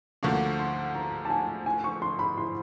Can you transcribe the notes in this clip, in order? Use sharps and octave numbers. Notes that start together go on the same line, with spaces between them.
D2 D3 F3 A#3 D4 C#6
C6
A#5
A5
G#5
G#5
C#6
C6
B5
C6